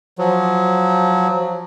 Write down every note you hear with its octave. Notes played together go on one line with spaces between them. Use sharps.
F3 F#3